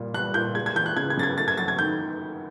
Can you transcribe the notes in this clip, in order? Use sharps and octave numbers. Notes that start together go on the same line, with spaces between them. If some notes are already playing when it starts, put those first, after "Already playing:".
Already playing: A#2 G3
G3 F#6
A#2 G6
G#3 G#6
G#6
E3 G6
F#6
C#3 G#6
G#6
F#2 A6
G#6
A3 A6
G#6
F#3 A6
G#6
D#3 G6